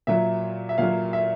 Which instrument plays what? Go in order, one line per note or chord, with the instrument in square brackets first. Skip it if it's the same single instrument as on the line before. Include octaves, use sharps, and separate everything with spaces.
[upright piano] A#2 F#3 E5
E5
A#2 F#3 F5
E5